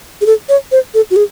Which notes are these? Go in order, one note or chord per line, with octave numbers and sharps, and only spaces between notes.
G#4
A4
C#5
C5
A4
F#4
G#4